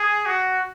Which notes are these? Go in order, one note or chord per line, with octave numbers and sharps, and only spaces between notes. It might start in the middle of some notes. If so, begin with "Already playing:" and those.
Already playing: G#4
F#4